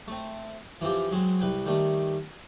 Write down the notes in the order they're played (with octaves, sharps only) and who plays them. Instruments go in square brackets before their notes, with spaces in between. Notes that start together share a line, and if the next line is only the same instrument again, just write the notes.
[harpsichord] A3 C4
E3 F3 C4 F4 G4
F#3 G#3 C4
C2 B4 G5
D#3 G3 A3